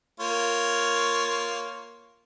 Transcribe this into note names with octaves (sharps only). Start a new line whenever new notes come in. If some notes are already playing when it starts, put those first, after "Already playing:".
A#3 F4 C#5